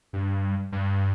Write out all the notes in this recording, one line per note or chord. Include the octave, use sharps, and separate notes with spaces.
G2
G2